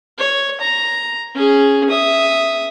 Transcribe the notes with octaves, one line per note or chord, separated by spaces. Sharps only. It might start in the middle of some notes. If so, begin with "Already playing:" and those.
C#5
A#5
C#4 G#4
E5 D#6